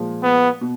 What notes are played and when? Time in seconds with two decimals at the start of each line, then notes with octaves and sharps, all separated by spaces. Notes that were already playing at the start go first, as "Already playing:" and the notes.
Already playing: A#2 F3 G#3
0.23 B3
0.61 B2